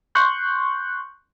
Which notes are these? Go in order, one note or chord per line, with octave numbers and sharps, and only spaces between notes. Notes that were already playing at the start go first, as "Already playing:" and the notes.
C6 C#6 F#6 G6